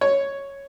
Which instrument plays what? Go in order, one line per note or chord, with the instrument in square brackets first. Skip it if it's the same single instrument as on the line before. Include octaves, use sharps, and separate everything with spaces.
[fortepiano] C#5